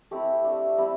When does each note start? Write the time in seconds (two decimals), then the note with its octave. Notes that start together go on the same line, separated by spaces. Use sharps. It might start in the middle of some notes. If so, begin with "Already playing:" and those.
0.11 A3 C4 E4 G4
0.45 A3 D4
0.78 G3 C4 E4